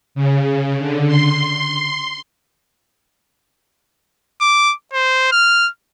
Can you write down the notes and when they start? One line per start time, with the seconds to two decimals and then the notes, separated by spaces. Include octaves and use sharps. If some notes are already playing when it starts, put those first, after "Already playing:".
0.15 C#3
0.79 D3
1.07 C6
4.41 D6
4.93 C5
5.32 F6